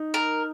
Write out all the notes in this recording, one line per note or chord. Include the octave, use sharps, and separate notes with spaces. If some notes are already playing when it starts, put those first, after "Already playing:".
Already playing: D#4
A#4